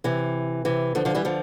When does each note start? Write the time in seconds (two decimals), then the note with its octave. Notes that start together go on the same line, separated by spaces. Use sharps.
0.04 C3 E3
0.65 C3 E3
0.95 D3 F3
1.05 D3 F3
1.15 E3 G3
1.25 D3 F3